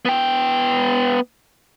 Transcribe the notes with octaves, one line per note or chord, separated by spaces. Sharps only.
B3 G5